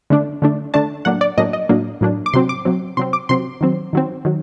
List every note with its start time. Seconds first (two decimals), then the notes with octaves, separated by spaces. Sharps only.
0.10 D3 A3 D4
0.42 D3 A3 D4
0.74 D3 A3 D4 A5
1.05 A2 F#3 A#3 D4 F#5
1.21 D5
1.38 A2 F#3 A#3 D4 D#5
1.53 D#5
1.69 A2 F#3 A#3 D4
2.01 A2 F#3 A#3 D4
2.26 D6
2.33 C3 F#3 C4 C6
2.49 D6
2.65 C3 F#3 C4
2.97 C3 F#3 C4 C6
3.13 D6
3.29 C3 F#3 C4 C6
3.61 D#3 F#3 C4
3.93 D#3 F#3 C4
4.25 D#3 F#3